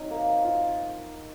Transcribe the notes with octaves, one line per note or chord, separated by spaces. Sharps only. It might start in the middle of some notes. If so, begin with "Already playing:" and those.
Already playing: F#3 C4 D#4
A#3
F4